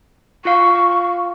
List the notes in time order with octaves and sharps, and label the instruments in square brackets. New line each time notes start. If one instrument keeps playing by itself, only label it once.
[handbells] F4 F5 [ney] C#6